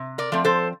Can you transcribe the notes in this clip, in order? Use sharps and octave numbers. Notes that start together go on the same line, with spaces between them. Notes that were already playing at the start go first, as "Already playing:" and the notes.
Already playing: C3
A#4 D5
F3 A3 C4
A4 C5